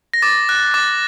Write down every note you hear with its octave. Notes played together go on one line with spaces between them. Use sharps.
A#6
D6 A6
F#6
D6 A6